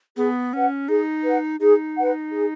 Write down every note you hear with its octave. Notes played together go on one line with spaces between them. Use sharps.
B3 G#4
C#4 B4 F#5
D#4 G#4
B4 F#5
D#4 G#4
B4 F#5
G#4